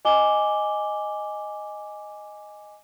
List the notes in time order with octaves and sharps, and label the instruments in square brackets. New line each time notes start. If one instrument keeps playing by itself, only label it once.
[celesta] D#5 G#5 D6 G7